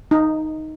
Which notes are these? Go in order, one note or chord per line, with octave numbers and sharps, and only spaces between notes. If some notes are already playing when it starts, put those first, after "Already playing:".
D#4